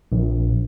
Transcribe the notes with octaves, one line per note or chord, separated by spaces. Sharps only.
A#1